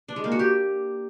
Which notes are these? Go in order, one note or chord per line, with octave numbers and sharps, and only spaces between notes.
D4
G#3
A#3
F#4
G4